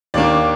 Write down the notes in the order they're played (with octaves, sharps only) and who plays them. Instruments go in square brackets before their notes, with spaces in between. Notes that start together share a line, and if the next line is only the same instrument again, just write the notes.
[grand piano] D#2 D#3 A#3 D4 D5